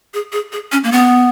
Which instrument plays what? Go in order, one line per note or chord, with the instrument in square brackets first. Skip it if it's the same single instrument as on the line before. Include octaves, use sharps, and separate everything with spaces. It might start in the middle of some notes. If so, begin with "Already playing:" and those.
[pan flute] G#4
G#4
G#4
C#4
A#3
B3